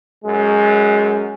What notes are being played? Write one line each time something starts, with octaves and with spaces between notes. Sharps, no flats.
F#2 G#3